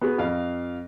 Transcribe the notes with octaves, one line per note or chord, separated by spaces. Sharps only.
B3 F#4 G#4
F2 F5